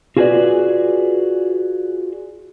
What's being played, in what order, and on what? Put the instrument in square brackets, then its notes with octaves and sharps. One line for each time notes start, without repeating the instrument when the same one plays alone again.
[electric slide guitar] F4 F#4 G#4 A#4 B4 D5